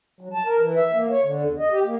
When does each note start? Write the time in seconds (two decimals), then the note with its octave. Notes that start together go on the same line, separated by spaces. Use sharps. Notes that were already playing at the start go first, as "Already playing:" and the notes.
0.21 F#3
0.34 A5
0.46 A#4
0.60 E3
0.76 E5
0.93 A#3
1.10 C#5
1.23 D3
1.44 E2
1.59 D#5
1.71 G4
1.85 A#3